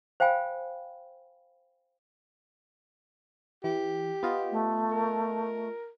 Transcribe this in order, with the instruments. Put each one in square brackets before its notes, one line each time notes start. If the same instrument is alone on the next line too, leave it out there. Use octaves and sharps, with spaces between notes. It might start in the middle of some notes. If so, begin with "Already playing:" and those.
[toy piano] C5 F5 G5 G#5 B5
[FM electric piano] E3 [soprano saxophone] G4
[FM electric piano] B3 F4 D#5
[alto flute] A3
[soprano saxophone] A#4